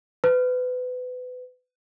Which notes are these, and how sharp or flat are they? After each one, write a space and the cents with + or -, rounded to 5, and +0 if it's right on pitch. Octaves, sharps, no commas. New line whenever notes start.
B4 +30